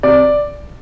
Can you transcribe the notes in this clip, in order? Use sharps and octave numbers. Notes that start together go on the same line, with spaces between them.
C3 D5